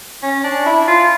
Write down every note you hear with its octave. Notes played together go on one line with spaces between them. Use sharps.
C#4
D4
E4
F4